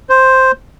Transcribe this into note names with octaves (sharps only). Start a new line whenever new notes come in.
C5